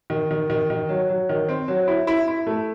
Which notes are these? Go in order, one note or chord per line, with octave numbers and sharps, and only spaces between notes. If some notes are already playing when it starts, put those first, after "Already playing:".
D#3
D#3
D#3
D#3
F#3
F#3
D#3
C4
F#3
E4
E4
E4
A3